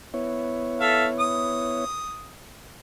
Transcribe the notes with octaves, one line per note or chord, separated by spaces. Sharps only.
B3 E4 C#5
A4 E5 F5
D#6